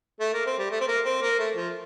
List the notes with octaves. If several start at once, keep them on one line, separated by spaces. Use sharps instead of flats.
A3
A#3
C4
G3
A3
C4
A#3
C4
A#3
A3
F3